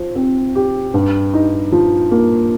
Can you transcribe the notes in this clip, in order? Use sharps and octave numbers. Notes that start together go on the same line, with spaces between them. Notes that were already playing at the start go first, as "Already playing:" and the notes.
Already playing: F3 C5
C4
G4
G2
D#4
F3
A#3